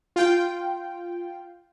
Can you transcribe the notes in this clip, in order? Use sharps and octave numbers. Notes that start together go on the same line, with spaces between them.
F4 G5